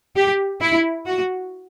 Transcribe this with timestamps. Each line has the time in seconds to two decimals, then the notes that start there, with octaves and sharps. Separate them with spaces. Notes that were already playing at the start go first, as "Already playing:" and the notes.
0.15 G4
0.61 E4
1.07 F#4